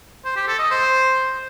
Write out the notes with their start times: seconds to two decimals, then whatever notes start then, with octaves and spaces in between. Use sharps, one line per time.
0.25 C5
0.36 G4
0.48 A4
0.59 D#5
0.70 C5